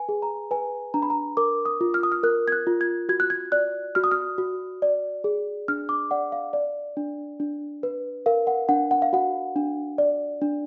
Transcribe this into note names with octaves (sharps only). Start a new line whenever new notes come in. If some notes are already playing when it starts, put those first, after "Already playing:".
Already playing: B4 G#5
G#4
A#5
B4 G#5
D4 A#5
B5
A#5
A#4 D6
D#6
F4
F6
D#6
F6
A#4 F#6
G#6
F#6
F4
G#6
F#4 G#6
F#6
G#6
D5 F#6
F#4 F6
D#6
F6
F#4
D5
G#4
D4 F6
D6
D5 F#5
F5
D5
D4
D4
B4
A#4 F5
F#5
D4 F#5
F#5
F5
F#4 F#5
D4
D5
D4